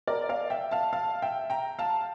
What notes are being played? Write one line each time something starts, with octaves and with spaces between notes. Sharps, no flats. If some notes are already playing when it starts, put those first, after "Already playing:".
A#4 D5
D5 F5
E5 G5
F5 A5
F5 A5
E5 G5
G5 A#5
F5 A5